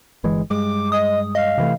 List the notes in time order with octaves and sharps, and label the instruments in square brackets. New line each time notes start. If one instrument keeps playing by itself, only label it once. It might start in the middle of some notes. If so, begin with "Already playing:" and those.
[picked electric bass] G1 E3 G#3
[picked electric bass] G2 G#3 [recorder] D6
[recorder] D#5 [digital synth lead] D#6
[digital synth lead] D#5 [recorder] F5
[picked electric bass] C3 E3 A3